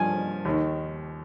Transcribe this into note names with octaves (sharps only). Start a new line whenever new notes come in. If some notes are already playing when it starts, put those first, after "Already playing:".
Already playing: G2 F3 G#5
D#2 D#3